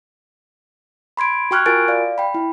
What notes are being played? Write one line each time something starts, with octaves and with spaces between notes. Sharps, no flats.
B5 C6 G#6 D7
F#4 G5 C#6 F6 F#6 G#6
F4 F#4 A#4 G#5 A6 D7
D5 F5
G5 B5
E4